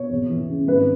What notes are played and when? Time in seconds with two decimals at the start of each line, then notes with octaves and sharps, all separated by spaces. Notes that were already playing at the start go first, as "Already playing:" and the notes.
Already playing: B2 C#5
0.10 E2
0.30 E3
0.49 C#3
0.67 G#1 B4